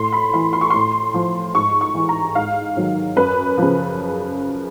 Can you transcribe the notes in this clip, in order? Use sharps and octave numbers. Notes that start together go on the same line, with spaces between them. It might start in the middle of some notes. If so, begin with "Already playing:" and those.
Already playing: A2 C6
B5
E3 C6
C6
C#6
A2 C6
F3
G#2 C#6
C#6
E3
A#5
G#2 F5
D#3 F#3
F#2 B4
C#3 F3